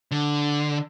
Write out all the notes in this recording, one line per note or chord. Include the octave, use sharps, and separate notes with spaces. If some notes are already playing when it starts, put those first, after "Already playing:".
D3